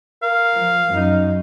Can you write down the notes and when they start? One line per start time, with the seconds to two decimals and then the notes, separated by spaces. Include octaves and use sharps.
0.23 A#4 F5
0.55 F3
0.94 F#2 D#4